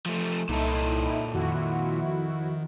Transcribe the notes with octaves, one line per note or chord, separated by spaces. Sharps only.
F3 A3
C2 A#2 D#4 E4 A4
F2 D#3 E4 F#4